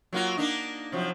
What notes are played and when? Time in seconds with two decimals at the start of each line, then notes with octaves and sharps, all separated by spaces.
0.13 F#3 A#3 F4
0.37 A#3 D4 D#4
0.92 C3 F3 F#3